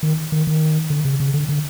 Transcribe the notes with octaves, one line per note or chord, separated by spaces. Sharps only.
D#3
D#3
D#3
D3
C#3
C#3
D3
D3